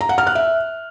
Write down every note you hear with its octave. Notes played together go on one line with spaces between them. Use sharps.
A#5
F#5
F6
F#6
E5